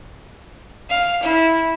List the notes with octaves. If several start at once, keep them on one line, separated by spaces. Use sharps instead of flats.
F5
E4